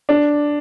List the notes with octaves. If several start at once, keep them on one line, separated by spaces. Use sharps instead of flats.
D4